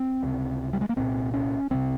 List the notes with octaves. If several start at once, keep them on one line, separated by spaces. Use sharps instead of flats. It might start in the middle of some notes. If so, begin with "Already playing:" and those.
Already playing: C4
C#2 C3
G3
G#3
A#3
C2 A#2 C4
C#4
C2 C3 C4